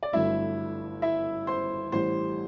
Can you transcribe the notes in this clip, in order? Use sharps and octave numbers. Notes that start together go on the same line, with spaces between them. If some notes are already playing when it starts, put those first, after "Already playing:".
D5
G1 G2 F#3 A3 E4 E5
E4 E5
C5 C6
A1 A2 G3 C5 C6